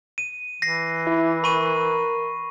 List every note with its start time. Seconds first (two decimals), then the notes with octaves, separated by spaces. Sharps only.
0.18 D#7
0.62 E3 A#6 C7
1.07 E4
1.44 A#4 B5 C#6 D#7